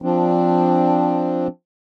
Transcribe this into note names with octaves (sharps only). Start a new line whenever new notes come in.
F3 C4 D4